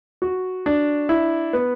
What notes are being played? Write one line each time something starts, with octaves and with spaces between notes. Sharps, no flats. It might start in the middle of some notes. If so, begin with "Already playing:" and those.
F#4
D4
E4
B3